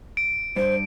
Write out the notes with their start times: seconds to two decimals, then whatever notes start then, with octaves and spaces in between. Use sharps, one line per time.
0.17 D7
0.56 G2 C5